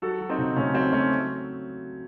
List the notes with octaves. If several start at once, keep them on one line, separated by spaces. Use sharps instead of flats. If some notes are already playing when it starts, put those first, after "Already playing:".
F#3 F#4 A4
F#3
C4 D#4
C#3
C#3 A3 C#4
F#3 C4
F#3 A3 C#4
F#3